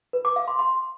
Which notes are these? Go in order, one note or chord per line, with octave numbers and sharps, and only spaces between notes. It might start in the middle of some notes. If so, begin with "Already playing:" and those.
B4
D6
F5
C6
C6